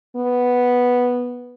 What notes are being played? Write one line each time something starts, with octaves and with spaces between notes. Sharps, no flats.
B3